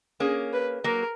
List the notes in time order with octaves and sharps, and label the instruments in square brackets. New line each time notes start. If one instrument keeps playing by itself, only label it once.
[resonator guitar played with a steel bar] A#3 C#4 [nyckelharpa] G#4
[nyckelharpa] B4
[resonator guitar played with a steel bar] F#3 A#3 [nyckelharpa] A#4